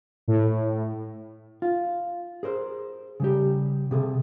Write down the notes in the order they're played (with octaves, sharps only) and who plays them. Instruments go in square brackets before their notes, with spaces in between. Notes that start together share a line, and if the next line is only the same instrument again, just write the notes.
[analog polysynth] A2
[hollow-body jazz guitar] F4
G#4 A#4 C5
C#3 G3 G4
C3 G#4 A4